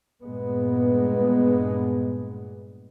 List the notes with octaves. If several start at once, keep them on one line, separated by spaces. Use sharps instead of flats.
G2 A#2 G#3 B3